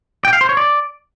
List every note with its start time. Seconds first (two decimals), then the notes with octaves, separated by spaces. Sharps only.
0.25 G5
0.33 F5
0.41 C5
0.49 C#5
0.57 D5